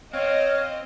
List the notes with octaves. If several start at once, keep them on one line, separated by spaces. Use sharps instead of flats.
C4 C#5 D#5 F5